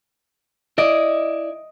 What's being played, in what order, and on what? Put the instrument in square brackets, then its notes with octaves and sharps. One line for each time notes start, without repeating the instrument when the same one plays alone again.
[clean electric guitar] E4 D5 [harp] D#5